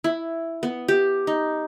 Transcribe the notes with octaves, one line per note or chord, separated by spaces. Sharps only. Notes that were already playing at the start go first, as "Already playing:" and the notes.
E4
B3
G4
D#4